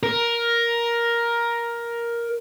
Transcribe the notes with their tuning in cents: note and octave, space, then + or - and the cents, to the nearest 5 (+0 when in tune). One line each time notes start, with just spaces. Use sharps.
A#4 +10